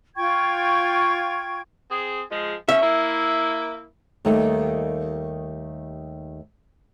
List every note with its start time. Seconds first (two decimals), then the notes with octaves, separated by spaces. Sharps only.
0.16 F4 G5 C#6 G#6
1.90 C4 G#4
2.31 F3 G#3
2.69 B2 C#4 E5
2.82 A#3 E4
4.25 D#2 D#3 G3 A3 D#4